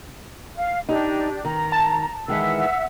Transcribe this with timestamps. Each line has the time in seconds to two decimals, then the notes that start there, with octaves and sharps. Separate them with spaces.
0.56 F5
0.89 D4 D#4 G4
1.45 D#3 A#5
1.72 A5
2.28 D#3 E3 G#3 E5 F#5 E6